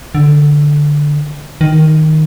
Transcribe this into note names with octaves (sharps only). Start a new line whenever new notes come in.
D3
D#3